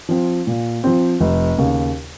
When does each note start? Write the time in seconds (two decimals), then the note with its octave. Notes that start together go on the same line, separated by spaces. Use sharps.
0.09 F3 C4
0.47 A#2
0.84 F3 C4
1.20 F1
1.58 D#2 C#3